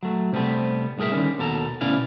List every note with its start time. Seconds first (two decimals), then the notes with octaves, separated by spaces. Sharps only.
0.03 F#3 A3
0.33 C3 G3 A3 B3 C4
0.98 C2 A2 G#4 A#4 E5
1.12 D3 D#3 G3 C#4
1.39 D#2 B2 A4 A#5
1.81 D2 B2 C#4 E4 D5 F5